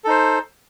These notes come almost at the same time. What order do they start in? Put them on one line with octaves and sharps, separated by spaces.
A4 D#4 C5